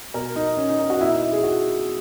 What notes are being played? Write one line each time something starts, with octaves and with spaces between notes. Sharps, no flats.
B2 A#4
D#4
C#4
D#4
A#4
F#4
B2 E4
D#4
E4
G#4
F#4